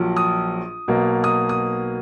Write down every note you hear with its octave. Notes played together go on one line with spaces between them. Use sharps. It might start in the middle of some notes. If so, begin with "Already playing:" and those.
Already playing: A#1 A#2 F#3
D#6
B1 B2 A#3
D#6
D#6